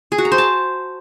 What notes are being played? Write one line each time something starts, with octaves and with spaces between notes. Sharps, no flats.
G#4
F#4
A#5
C5
A5